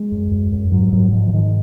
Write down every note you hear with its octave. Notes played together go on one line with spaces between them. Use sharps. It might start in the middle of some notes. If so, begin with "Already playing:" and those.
Already playing: G#3
F#2
F#2
F#2
G#2 F#3
G#2 F#3
G#2 F3
F3
G#2 D#3